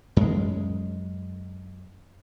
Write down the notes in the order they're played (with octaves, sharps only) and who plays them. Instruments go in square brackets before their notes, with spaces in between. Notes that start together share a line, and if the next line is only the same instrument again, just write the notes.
[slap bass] F#2 G#3